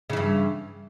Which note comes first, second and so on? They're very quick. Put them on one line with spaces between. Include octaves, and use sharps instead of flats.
C#3 E3 G2